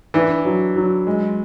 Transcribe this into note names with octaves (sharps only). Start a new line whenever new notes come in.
E3 D4
F#3
F#3
G#3